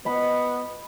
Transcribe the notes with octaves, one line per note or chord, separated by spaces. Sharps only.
B3 D#5 B5